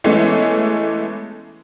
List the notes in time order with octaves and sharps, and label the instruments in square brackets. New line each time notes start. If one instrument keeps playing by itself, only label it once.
[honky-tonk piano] E3 G#3 A3 B3 C#4